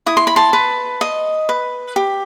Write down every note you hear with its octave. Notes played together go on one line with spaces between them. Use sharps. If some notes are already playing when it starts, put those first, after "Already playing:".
E4 D#6
C6
B5
A5 C6
B4
D#5
B4
G4